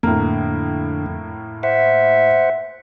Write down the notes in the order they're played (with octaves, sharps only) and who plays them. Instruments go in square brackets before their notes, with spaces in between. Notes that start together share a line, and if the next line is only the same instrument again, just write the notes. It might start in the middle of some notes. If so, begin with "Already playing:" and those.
[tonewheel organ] F2 D3 [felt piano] A2 A#3
[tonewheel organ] C5 F#5 [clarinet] E5